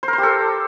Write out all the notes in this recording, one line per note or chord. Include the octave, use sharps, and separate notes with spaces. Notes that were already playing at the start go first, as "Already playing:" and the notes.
C5
A#4
C5
G4
A4